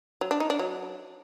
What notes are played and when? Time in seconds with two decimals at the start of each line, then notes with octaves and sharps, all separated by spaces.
0.21 F#3
0.31 D4
0.40 D#4
0.50 D4
0.59 F#3